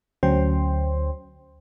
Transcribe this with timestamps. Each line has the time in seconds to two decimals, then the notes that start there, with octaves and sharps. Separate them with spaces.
0.23 D2 F#3 C#4 C5 G5 C6